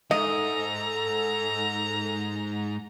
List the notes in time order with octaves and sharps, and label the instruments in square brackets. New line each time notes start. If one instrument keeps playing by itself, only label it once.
[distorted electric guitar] G#2 [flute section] A4 [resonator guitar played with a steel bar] D#5 [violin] A#5